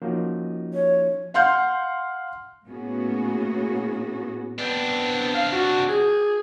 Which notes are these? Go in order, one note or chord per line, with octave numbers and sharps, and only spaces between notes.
F3 A#3 C#4 D#4 F#4
C#5
F5 F#5 C6 F6 G6
A2 A#3 B3 C#4 F#4 G#4
B3 C4 D4
F5
F#4
G#4